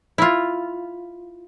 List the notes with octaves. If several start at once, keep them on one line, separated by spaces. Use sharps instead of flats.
E4 F4